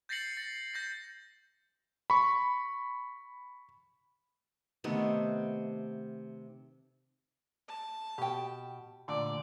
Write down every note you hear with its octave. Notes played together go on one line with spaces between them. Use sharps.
G6 A6 A#6 C7 C#7 F#7
A6
G6 A#6 C7
B5 C#6
C3 D#3 A3 B3
A5
B2 G4 G5
A#2 D3 A3 D5